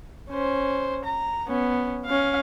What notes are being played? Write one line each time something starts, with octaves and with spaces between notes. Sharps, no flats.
C#4 C5
A#5
B3 C#4
C#4 F5